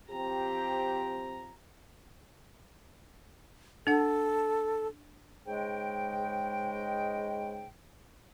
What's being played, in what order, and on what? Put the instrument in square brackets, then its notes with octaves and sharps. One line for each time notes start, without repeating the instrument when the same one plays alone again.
[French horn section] F3 C4 G4 [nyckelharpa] A#5
[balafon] D4 F#5 [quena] A4
[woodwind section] G#2 C#3 G#3 D#5 G5